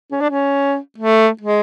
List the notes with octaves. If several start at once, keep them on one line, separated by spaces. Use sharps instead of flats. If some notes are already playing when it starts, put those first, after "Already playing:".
C#4
D4
C#4
A3
G#3